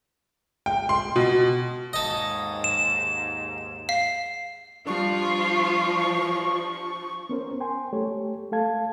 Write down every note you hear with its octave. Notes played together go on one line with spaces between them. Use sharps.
G5
C6
B2
D#2 G#2 A4 D#5
E7
F5 C7
F3 G3 D4 F4 C#6
B3 C#4 A#4 C5
G5 G#5 C6
A3 G4 A4 C#5
A3 A4 F5 A5 G#6